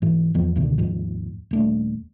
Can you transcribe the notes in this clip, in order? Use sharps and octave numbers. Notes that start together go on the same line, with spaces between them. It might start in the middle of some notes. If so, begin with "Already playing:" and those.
G#2 E3
E2 F3 B3
C#2 B2 D3 D#3
D#2 G#2 F3
D#1 A3 D4